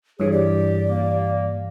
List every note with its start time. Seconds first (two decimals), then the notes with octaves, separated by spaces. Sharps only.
0.20 G2 E3 G#4 C#5
0.32 G4 D5
0.88 A#3